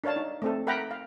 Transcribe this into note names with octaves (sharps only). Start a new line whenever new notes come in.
D4 A#4 C#5 F5 A5
D#4
A3 C4 A4
A#4 E5 F#5 G5 A#5 B5
F5